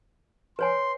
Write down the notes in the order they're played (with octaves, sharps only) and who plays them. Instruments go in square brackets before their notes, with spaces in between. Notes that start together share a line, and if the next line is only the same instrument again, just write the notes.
[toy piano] B4 C#5 G#5 [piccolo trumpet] C6